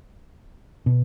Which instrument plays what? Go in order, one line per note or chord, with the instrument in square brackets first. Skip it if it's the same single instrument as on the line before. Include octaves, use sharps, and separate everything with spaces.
[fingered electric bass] B2